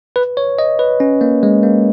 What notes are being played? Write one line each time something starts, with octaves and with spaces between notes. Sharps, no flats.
B4
C#5
D#5
B4
C#4
A#3
G#3
A#3